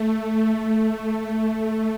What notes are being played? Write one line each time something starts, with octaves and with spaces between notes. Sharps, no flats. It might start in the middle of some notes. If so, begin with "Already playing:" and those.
Already playing: A3
A3